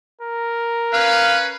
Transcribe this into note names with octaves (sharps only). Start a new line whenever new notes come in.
A#4
C#4 B4 F5